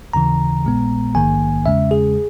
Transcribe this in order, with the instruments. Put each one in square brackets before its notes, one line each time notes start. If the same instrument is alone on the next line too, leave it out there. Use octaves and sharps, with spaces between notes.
[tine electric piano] D#2 C#3 E3 A#5
A#1 A#2 G#3 B3
A#1 G#2 D#3 A#3 G#5
E2 C#3 G#3 C#4 E5
G#4